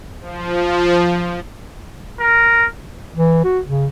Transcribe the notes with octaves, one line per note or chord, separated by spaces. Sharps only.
F3
A#4
E3
F#4
C#3